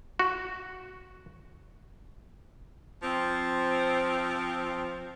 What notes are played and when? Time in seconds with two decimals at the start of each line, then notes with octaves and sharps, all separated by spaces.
0.19 F#4
3.02 F3 C4